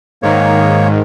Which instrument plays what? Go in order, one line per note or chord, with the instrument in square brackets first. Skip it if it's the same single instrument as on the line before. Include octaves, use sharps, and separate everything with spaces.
[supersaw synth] G#2 D#3 [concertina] A#3 C#5